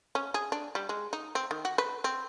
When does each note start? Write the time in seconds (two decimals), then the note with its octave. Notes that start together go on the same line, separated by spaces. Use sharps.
0.15 C#4
0.34 G#4
0.52 D4
0.75 G3
0.89 G#3
1.13 D#4
1.35 C4
1.51 D#3
1.65 F#4
1.78 B4
2.04 C4